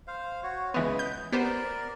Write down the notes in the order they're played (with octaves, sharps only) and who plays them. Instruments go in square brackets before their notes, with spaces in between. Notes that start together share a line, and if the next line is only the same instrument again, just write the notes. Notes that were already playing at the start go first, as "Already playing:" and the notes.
[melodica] C5 F5
F#4 C#5
[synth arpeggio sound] C#2 E3 B3 [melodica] B4 D#5
[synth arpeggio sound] G6
[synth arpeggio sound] B3 G4 C5 [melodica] A#4 D5